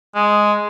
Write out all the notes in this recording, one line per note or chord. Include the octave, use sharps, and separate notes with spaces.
G#3